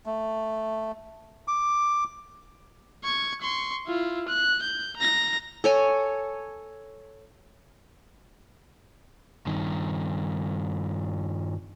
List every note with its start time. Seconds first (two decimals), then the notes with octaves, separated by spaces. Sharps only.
0.06 A3
1.48 D6
3.04 C#6 G#6
3.42 C6 C#6
3.87 E4 F4
4.28 F#6
4.62 G6
4.97 A#5 A#6
5.64 A4 C#5 G#5
9.47 G2 D#3